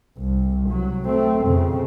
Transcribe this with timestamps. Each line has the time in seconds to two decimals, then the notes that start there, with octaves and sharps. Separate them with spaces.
0.19 C2
0.70 F#3
1.06 A3 C4
1.46 F2 C#3